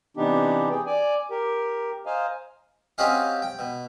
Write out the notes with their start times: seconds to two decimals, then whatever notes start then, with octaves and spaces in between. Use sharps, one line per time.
0.17 C3 E3 B3 D4 D#4 G4
0.71 G#4 G5
0.86 D5 G#5
1.30 G4 A#4
2.06 C5 D#5 F5 G#5 A#5
2.98 C4 C#4 F#4 G4 D#5 F5
3.42 G5
3.59 B2